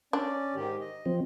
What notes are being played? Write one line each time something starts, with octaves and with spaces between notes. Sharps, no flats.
C#4 D4 D5
G#2 D#3 G4
D#5
F3 C4